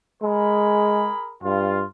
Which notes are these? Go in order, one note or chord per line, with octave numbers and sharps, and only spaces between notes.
G#3 G#4 A#4 B5
G2 F4